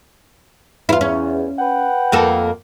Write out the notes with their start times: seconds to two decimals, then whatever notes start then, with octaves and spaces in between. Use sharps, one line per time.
0.89 E2 E4 F4
1.01 C#4
1.59 B4 F#5 G5
2.12 F2 A#3 A4